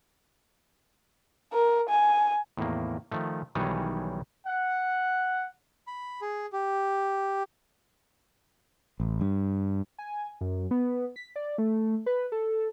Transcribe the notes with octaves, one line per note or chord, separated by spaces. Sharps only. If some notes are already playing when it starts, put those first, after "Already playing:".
A#4
G#5
E2 A2 D#3 A#3
D#3 F3 A3
B1 D#3 E3 G3 G#4 C#5
F#5
B5
G#4
G4
A1
G2
G#5
F#2
B3
B6
D5
A3
B4
A4